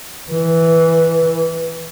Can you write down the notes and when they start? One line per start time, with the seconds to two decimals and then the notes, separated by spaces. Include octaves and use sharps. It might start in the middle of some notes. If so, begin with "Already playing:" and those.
0.32 E3